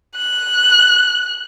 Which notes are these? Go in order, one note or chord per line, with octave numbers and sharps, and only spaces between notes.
F#6